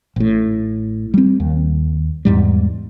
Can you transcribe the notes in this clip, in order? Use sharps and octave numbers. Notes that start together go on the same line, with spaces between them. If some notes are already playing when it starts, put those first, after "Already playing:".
A1 A2
G3 C4
D#2
E2 G#2 G3